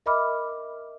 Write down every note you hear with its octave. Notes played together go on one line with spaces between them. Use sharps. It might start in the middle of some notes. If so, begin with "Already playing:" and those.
A#4 D#5 E5 B5 D6 F6